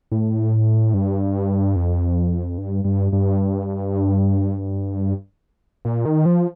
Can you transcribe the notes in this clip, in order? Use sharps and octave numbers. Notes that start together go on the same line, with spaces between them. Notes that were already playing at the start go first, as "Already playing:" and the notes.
A2
G2
F2
G2
G2
G2
A#2
D#3
F3